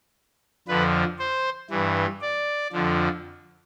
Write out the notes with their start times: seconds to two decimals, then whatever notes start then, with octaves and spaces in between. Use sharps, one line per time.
0.68 F2 D3 F3 B4
1.19 C5
1.70 G2 E3
2.21 D5
2.73 F2 D3 F3